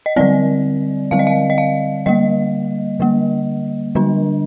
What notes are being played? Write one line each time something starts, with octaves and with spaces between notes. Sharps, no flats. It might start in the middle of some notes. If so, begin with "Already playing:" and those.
D#5
D3 G3 C4 D5
D3 G3 C4 F5
D#5
F5
D#5
F5
D3 G3 A#3 D#5
D3 G3 A#3
D3 G3 D4